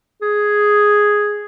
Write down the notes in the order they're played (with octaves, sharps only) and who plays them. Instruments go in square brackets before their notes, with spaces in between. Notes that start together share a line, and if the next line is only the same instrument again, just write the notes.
[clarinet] G#4